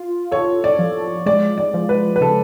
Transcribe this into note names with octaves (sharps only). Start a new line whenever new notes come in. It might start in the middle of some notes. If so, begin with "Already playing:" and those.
Already playing: F4
A4 C#5
D5
F3
G#3 D5
D5
F3
B4
B4
C#3 A4